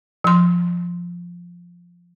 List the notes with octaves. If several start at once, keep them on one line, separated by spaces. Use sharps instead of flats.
F3 C6